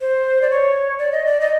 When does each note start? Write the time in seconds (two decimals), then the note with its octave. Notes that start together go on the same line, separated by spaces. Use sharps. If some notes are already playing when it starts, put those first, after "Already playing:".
0.01 C5
0.42 D5
0.50 C#5
0.99 D5
1.12 D#5
1.26 D5
1.40 D#5